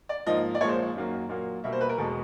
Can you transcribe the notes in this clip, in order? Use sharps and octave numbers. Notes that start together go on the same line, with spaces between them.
D5
G#2 F3 A#3 D#5
D5
A#2 F3 G#3 C#5
C5
F#2 D#3 F#3 A#3
A#2 F#3 A#3
B2 G3 A#3 E5
C5
B4
A#4
E2 B2 G#3 A4